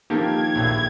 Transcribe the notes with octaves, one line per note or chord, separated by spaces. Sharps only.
D#3 F3 A#3 G4 A4 G#6
A#1 A2